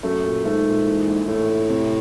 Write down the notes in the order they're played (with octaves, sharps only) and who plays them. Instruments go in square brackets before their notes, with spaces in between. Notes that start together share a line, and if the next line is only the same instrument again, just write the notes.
[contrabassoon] F#2 [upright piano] A3
[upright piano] A#2
[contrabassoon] G#2 [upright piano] A3
[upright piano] A#2
E3
A#1
[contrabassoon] A2 [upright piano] A3
[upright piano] A3
C3